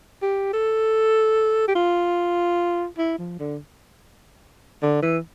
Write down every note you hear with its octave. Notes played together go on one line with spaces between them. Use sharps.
G4
A4
G4
F4
E4
F3
D3
D3
E3